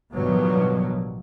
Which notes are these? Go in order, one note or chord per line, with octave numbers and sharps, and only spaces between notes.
A1 G2 B2 D#3 F3 F#3